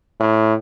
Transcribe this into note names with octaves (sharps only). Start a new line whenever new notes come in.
A2